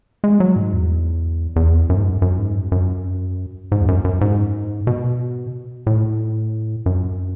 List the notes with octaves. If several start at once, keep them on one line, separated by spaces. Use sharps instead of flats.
G#3
F#3
G#2
E2
E2
F#2
G#2
F#2
F#2
G#2
F#2
F#2
G#2
E2
F#2
F#2
G#2
B2
A2
F#2